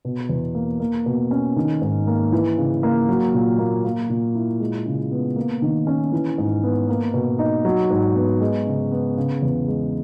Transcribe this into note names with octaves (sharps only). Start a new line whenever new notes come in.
B2
E2
A#3
A#3
B2
C#4
D#3
G#2
A#3
E3
C#3
A#3
F#3
A#2
A#3
A#3
A#2
E4
G#3
C#3
B3
A#3
D#3
C#4
E3
G#2
B3
A#3
B2
D#4
F#3
G#2
B3
G#3
C#3
B3
C#3
E2
G#3